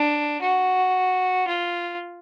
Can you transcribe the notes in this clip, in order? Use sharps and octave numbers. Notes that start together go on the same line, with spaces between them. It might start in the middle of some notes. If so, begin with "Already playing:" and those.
Already playing: D4
F#4
F4